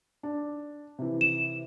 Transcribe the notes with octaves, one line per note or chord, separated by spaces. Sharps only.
D4
C3 E3
E7